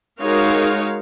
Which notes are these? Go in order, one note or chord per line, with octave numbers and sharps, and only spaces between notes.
G#3 D#4 F#4 A#4 C#5 F5